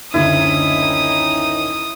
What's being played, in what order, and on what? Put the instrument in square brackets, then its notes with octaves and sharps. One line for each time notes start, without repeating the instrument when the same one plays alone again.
[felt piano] F#1 D2 D3 [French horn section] D#3 C#4 D#4 [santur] E4 [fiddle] D#6